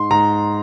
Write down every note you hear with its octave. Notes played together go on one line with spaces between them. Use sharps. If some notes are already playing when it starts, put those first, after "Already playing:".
Already playing: G#2 C6
G#2 A#5